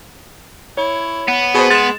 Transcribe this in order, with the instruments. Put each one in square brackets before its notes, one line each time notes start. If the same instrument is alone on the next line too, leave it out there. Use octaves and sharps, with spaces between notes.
[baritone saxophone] E4 [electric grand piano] C#5
[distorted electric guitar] B3
[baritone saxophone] B2 [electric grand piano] G#4 C5
[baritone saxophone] G#3 [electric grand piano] A6 E7